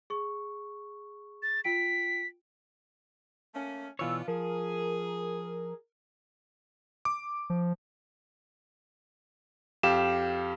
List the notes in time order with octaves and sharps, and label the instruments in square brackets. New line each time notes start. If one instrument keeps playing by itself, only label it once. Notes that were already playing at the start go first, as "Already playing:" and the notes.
[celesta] G#4 C#6
[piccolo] A6
[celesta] F4 G5 D7 [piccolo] B6
[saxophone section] A3 A#3 C#4
[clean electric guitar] B2 E3 C#5 [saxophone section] B3 D4 F4 [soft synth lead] E6
[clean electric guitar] F3 [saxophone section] G#4 [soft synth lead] A#4
[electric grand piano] D6
[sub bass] F3
[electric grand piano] F2 G4 F5 E7